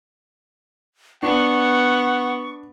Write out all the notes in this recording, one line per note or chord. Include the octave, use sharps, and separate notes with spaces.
B3 D4 F#5 C#6